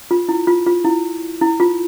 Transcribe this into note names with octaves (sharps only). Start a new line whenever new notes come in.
F4
E4
F4
F4
E4
E4
F4